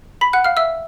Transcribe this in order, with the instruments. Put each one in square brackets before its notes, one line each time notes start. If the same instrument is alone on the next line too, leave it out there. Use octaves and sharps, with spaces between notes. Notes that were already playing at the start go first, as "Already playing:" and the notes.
[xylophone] B5 B6
F#5 F#6
F5 F6
E5 E6